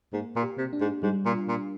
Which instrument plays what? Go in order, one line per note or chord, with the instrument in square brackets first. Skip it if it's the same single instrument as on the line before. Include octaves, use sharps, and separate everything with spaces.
[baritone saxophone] G#2 [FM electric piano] A#3
[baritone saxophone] A#2
[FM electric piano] G4
[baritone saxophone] C3
[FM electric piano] D4
[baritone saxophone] G#2
[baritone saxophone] G#2 [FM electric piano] G3
[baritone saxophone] A#2
[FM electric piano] F4
[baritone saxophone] A#2